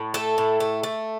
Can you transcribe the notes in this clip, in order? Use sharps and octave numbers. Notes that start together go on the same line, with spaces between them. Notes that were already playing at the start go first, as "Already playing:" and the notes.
Already playing: A2
A3 A4
A2
A3
A3